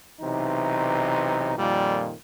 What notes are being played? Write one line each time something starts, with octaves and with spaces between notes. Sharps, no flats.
B1 C3 E3 D#4
F2 A#2 D#3 G3